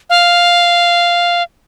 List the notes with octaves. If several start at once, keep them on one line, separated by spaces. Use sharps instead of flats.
F5